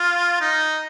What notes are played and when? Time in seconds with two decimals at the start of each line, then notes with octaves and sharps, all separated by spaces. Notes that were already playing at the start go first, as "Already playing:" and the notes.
Already playing: F4
0.41 D#4